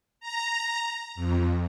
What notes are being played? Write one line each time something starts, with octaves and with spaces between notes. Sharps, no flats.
A#5
F2